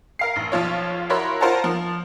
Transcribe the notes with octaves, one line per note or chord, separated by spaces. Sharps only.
A#4 F5 C7
A1
B1 F3 F4 C#5
E4 F#4 A#4 C#5 B5 C6
F4 A#4 C5 F#5 A5 A#5
F3